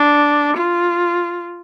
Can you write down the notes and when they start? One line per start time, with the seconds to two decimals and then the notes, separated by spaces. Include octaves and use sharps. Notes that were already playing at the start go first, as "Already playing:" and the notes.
Already playing: D4
0.57 F4